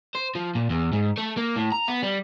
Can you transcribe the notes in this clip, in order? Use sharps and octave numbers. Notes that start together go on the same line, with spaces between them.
C5
F3
A#2
E2
G#2
A3
A#3
A2
A#5
B3
G3